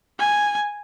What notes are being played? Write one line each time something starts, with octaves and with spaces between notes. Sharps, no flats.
G#5